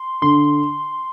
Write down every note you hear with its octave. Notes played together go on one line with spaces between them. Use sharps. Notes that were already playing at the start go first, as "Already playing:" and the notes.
Already playing: C6
D3 C6